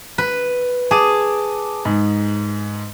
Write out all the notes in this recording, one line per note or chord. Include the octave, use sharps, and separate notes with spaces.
B4
G#4 A5 D6 D#7
G#2